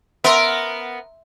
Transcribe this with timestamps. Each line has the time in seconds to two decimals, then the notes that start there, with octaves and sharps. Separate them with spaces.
0.24 B3 A#4 E5 C6 E6